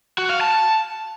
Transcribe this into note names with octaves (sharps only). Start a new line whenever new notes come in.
F#4
F5
A5